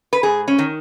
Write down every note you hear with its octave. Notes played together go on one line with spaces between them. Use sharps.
B4
G#2 G#4
C#4
D#3